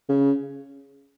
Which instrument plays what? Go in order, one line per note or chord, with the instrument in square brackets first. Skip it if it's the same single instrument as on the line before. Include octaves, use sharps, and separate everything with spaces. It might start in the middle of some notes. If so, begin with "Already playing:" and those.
[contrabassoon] C#3